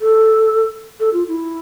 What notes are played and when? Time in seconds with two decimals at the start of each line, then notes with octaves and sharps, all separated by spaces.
0.01 A4
1.00 A4
1.13 F4
1.28 E4